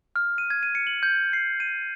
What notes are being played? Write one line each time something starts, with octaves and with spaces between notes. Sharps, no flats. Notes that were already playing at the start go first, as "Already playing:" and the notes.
F6
D#7
G#6
D#7
C#7
F#7
G6
C7
D#7